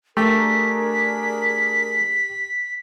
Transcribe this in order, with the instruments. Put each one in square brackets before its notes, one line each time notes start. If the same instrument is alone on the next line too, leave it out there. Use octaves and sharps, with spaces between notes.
[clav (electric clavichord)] A3 [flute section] D4 G#4 A#4 [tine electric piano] G4 [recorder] B6